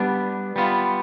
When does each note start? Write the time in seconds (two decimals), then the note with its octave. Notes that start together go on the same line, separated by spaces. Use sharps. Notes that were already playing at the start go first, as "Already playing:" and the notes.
Already playing: G3 B3 D4
0.56 G3 B3 F4